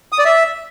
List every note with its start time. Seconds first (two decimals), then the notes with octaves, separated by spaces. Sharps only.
0.12 D#6
0.19 D5
0.25 E5